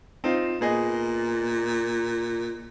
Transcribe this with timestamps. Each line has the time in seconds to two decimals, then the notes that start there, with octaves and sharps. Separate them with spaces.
0.24 C4 D#4 F4
0.61 A#2 B3 G#4 D#5